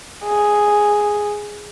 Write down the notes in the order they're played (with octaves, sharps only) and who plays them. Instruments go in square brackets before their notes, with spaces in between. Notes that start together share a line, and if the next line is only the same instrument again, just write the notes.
[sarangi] G#4